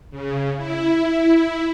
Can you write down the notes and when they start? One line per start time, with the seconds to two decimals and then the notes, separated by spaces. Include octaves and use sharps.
0.11 C#3
0.57 E4